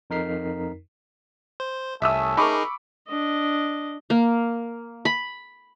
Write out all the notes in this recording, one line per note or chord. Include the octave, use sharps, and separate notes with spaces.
F2 D#4 A#4 B6 C7
C5
C2 A3 C#4 E5 D#6 E6
D#4 G#4 A#4 B5 C#6 D6
D4 D#5
A#3
B5